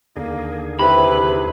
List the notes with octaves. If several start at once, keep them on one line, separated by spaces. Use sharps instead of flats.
D#2 D3 A#3 G#4
C3 E4 B4 B5